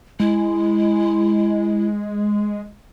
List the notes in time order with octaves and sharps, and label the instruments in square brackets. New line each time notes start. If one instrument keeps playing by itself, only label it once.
[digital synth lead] G#3 [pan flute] E4